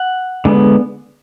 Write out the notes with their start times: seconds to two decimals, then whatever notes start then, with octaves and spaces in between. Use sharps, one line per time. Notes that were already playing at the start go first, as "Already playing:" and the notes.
Already playing: F#5
0.45 D3 G#3 B3